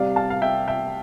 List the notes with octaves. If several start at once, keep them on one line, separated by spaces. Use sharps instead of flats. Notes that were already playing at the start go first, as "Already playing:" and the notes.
Already playing: C2 C3 G3 C4 D5 F5
F5 A5
F5
E5 G5
E5 G5